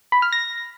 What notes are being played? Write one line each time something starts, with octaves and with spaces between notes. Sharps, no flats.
B5
F6
A#6